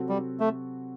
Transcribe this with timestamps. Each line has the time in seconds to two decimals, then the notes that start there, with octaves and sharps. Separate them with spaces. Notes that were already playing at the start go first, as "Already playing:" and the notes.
Already playing: C3 F#3 C4 F#4 A4
0.09 G3
0.40 A3